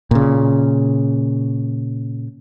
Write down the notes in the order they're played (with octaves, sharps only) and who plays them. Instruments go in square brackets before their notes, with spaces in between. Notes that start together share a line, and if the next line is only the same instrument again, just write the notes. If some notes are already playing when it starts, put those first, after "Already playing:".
[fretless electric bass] A#2 C#3